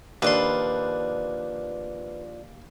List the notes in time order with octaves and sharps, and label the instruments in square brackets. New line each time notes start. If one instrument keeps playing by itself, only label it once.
[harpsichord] D#2 C6 [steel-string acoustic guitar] F3 D4 [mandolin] B4